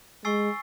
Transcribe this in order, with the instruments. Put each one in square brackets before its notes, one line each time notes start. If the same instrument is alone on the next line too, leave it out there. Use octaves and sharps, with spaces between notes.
[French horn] G#3 [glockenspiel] G#5 C#6 E6 A6 C7